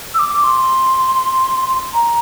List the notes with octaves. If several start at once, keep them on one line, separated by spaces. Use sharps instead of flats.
E6
D6
C6
A#5